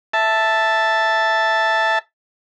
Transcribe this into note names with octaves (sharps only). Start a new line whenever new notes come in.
E5 A5